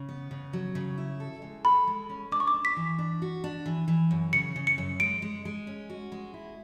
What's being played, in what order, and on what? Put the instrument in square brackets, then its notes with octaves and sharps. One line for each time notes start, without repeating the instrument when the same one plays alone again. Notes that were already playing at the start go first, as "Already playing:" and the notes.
Already playing: [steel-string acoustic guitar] C#3
B3
C#3
F#3
C#3
E4
A4
G#3
[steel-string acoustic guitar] A4 [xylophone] B5
[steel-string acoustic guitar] G#3
C#4
[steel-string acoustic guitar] D4 [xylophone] D6
[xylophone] C#6
D6
[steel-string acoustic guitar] D4
[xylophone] B6
[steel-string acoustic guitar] E3
D4
F#4
D4
E3
E3
F#2
[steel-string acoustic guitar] C#3 [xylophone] C#7
[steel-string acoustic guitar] C#3
[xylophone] C#7
[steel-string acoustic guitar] F#2
[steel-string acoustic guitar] G#3 [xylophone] D7
[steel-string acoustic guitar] G#3
G#3
C#4
F#4
G#3
E4